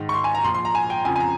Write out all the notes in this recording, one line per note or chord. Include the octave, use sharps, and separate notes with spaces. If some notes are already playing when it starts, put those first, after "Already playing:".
Already playing: G#2 D#3
C#6
C6
G#5
A#5
A#2 F3 C6
C6
A#5
G#5
G5
F2 C#3 F3 G#5
G#5
A#5